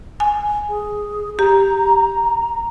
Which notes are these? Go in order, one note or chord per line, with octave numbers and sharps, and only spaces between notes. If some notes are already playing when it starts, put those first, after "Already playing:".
G#5
G#4
G4 A#5